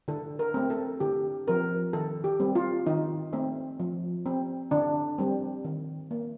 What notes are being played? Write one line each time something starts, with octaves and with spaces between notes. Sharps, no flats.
D3 A4
A#4
A3 C4
A4
D3 G4
F3 C4 A#4
D#3 A4
G4
G3 C4
F4
D#3 D#4
A3 C4
F3
C4
D3 D4
G3 C4
D#3
A#3